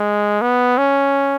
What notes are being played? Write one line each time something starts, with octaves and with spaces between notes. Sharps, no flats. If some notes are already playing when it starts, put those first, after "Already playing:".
Already playing: G#3
B3
C#4